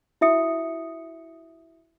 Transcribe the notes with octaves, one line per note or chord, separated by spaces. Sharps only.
E4 F#4 E5 D#6 C#7